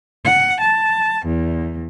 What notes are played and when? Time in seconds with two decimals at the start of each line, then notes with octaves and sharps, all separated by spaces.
0.25 F#5
0.61 A5
1.27 E2